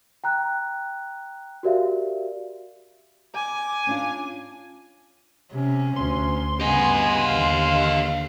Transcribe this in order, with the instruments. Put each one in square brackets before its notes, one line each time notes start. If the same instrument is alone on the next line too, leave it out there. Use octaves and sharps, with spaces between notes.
[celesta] G5 A#5 F#6
F#4 G4 A#4 D5 E5 F5
[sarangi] G#5 [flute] D6
[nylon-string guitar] C#4 D4 F4
[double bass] C3 [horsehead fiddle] C#4
[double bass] D2 [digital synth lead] C6
[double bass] G2 C#3 [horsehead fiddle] B3 G#5 [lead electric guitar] G4 D#5
[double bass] D#2 D3 [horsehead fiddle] F5